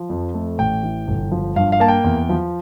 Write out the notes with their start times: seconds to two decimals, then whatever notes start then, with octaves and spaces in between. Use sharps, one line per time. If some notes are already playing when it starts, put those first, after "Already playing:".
Already playing: F3
0.10 F2
0.34 A3
0.58 A1 G5
0.83 E3
1.07 G1
1.31 F3
1.56 G2 F5
1.72 F5
1.80 A#3 A5
1.88 G5
2.04 E2
2.29 F3